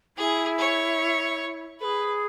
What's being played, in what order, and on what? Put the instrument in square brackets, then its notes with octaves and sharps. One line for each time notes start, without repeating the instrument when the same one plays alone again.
[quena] E4 [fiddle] G#4
[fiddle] C#5
[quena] A4 [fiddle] B4
[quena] G#4